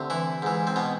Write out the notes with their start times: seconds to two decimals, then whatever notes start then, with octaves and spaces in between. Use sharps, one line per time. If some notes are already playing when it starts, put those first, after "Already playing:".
Already playing: D2 C3
0.10 E3 E4
0.42 G#2 E3
0.67 C4
0.76 B2 B3